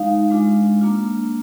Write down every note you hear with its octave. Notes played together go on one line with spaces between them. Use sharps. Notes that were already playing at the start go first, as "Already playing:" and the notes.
Already playing: G#3 D#4 F5
G#3 D4 F4
A#3 D4 F4